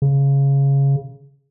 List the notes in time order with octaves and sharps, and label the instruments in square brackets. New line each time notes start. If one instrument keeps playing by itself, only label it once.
[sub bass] C#3